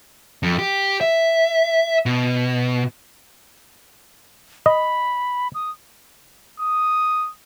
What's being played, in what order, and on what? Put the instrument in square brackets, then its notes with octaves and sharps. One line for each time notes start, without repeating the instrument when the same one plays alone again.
[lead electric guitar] F2
G4
E5
B2
[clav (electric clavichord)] D#5 [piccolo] B5
[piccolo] D#6
[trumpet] D#6